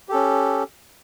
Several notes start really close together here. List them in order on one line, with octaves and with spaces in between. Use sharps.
G4 A4 C#4